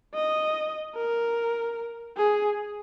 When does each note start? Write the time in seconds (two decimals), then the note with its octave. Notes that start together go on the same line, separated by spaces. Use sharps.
0.15 D#5
0.95 A#4
2.17 G#4